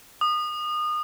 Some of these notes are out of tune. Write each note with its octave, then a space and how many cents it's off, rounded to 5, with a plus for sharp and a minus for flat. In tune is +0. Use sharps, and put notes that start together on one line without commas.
D#6 -30